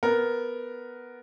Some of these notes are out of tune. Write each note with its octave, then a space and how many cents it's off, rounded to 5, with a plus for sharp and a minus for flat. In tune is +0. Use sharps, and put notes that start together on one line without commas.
B3 +0 A#4 +0